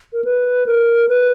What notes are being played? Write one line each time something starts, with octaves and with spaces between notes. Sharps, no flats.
A#4
B4
A#4
B4